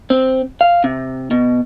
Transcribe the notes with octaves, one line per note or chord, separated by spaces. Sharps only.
C4
F5
C3
B2